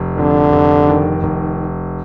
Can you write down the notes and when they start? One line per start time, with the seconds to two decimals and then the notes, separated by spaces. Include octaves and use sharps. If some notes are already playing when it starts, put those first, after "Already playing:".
Already playing: F1
0.17 F2 D3
0.52 F1
0.87 D#3
1.23 F1